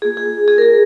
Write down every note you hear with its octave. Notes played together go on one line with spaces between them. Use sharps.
A#3 F4 G#4
G#4
G#4
A#4
G#4